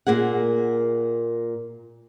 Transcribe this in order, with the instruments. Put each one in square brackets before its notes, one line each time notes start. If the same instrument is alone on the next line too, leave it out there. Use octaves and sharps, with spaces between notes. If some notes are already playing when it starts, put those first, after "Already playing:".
[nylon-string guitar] A#2 A#3 G#4 F#5